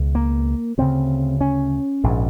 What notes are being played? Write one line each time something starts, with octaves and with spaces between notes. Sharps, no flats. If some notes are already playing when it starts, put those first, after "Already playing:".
Already playing: C#2 B2
A#3
D2 C#3 C4
C#4
A#1 G#2